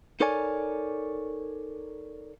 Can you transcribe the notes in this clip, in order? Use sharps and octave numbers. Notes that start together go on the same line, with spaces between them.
D#4 A4 A#4 C#5 D5 G#5